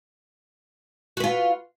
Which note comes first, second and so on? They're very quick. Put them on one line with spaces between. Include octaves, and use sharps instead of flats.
F#4 B4 F4